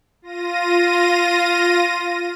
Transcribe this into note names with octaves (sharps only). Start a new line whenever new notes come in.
F4 A#6 D#7